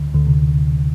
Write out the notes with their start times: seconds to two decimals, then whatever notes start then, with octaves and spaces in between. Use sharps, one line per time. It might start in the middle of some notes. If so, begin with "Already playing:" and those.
Already playing: D2 D3
0.14 D2 D3
0.27 C3